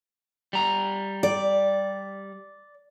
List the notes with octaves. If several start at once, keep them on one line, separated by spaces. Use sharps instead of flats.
G3 A#5
D5